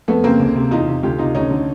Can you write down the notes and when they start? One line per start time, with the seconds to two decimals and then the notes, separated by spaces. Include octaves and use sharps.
0.08 F2 A3 B3
0.24 C#3 A#3 C4
0.39 D2
0.56 C3
0.71 E2 D#4 F4
0.88 C3
1.03 D2 F4 G4
1.19 C3 D#4 F4
1.35 D2 C#4 D#4
1.51 D3